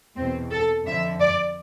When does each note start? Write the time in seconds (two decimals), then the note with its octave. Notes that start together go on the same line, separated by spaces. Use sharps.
0.16 E2 B2 C4
0.51 A4
0.86 F2 D3 F3 E5
1.20 D5